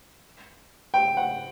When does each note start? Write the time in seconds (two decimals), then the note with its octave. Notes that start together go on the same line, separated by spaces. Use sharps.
0.94 G5
1.17 F#5